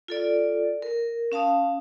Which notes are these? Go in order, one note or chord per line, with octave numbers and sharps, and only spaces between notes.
F4 A4 D5
A#4
C#4 F5 A5 D#6